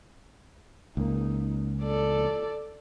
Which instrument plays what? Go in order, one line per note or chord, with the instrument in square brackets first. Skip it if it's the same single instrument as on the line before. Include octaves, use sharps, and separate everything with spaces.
[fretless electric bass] C#2 A#3 [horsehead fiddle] D#4
[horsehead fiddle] A4 D5